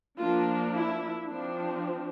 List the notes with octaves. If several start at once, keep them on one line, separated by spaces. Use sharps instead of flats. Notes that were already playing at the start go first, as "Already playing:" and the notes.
F3 A#3 D4 F4
E4
F3 C4 D4